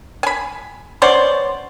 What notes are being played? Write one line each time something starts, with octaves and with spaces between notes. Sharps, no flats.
G#5 B5
B3 C#4 C5 D5